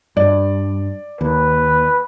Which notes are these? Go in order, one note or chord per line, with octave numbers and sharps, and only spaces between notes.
G2 D5
D#2 B4